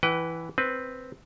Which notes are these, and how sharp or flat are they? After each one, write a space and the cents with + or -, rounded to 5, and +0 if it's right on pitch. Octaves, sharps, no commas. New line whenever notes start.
E3 +0 B4 +0 G5 -40
C4 +0 B4 +0